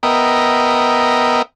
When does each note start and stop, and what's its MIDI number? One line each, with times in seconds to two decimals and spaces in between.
0.03 1.42 59
0.03 1.42 70
0.03 1.42 75
0.03 1.42 76
0.03 1.42 79